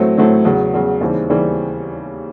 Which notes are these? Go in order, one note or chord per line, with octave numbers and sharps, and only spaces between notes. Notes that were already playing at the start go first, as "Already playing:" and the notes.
Already playing: A2 F#3 A3 C4
A2 F#3 A3 C4
E2 C#3 F#3
E2 C#3 F#3
D#2 C#3 E3 G3 C4
D#2 C#3 E3 G3 C4